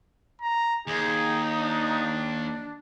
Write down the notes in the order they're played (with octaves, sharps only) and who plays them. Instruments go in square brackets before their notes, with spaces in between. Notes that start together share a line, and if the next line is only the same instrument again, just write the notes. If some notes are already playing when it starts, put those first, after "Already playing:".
[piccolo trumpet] A#5
[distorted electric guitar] D#2 [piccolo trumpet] D#4 [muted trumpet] G#4
[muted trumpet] D4